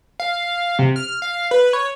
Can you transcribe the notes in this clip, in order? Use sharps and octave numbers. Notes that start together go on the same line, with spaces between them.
F5
C3
F6
F5
B4
C#5